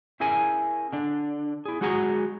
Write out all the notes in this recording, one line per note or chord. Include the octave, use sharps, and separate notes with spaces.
C#4 E4 G#4 A#4 G#5
D3 D4
E4 G#4
F#3 G#3 F#4 G#4 F#5 A#5